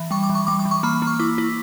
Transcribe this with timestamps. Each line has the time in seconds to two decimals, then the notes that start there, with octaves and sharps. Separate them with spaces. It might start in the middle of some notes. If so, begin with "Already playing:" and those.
Already playing: E3
0.11 G3 C#6
0.23 D6
0.30 E3
0.35 C#6
0.47 G3 D6
0.59 D6
0.65 E3
0.71 C#6
0.83 A#3 B5
0.95 B5
1.02 A#3
1.07 C#6
1.20 E4 D6
1.38 E4